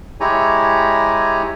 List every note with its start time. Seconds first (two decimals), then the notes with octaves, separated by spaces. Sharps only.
0.20 G#3 E4 G4 C#5 G#5 A#5